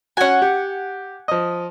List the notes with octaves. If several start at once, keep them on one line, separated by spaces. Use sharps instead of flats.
C#4 F#4 F#5 G#5
G4
F3 D#5